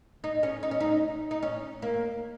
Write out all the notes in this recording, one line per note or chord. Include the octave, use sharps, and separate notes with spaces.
D#4
C#4
D#4
C#4
D#4
D#4
C#4
A#3